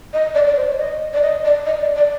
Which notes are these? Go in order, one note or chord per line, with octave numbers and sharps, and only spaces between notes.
D#5
D5
D5
C5
C#5
D#5
D5
D#5
D5
D#5
D5
D5